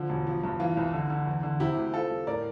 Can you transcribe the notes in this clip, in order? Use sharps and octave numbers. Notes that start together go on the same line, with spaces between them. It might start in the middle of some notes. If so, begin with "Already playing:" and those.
Already playing: D3 F3
E1
F3
G2
E3 F4
C2
D3
D3
E2
D3
C3 E4 G4
D2
C4 F4 A4
G3
A2 A#4 D5